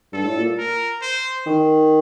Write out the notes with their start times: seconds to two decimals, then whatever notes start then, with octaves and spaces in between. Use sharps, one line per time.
0.12 G2 A4
0.24 A2
0.36 A#2
0.58 A#4
1.02 C5
1.46 D#3